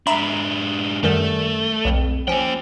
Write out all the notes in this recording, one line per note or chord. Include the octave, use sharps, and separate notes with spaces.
G#2 D4 E5 A#5 B5
F#2 D#3 G3 A3
B1 F2
F3 A#3 C#4 G5